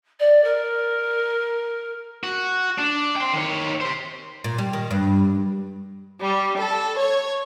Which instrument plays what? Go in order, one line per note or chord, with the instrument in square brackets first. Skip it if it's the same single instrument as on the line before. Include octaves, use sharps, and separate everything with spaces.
[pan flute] D5
A#4
[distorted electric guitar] F#4
D4
G5 C6
D#3 C#5
G4 C5
[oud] A#2
G3
D#3
G2
[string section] G3
A4
C#5